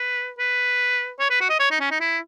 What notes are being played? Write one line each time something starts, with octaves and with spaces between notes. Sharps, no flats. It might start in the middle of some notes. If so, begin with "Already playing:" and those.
Already playing: B4
B4
C#5
B4
F#4
D#5
C#5
D#4
C#4
D#4
E4